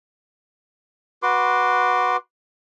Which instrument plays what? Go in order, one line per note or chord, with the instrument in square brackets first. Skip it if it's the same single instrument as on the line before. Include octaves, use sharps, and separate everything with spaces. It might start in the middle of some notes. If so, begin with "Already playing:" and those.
[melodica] F#4 B4 C6 D6